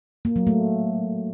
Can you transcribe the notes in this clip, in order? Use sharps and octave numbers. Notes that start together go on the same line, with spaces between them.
A#3
F#3
A3